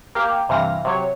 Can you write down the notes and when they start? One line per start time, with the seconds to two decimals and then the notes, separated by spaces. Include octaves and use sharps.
0.15 A#3 G4 F5
0.49 G2 C3 E3 F5 A#6
0.85 C3 F#3 C#5